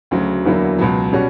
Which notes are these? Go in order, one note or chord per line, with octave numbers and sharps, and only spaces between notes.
D2 C#3 F#3
E2 D3 F#3 A#3 E4
C#2 B2 F#3
B2 G3 C#4 F#4